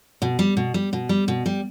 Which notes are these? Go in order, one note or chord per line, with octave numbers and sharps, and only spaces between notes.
B2
G3
B2
G3
B2
G3
B2
G3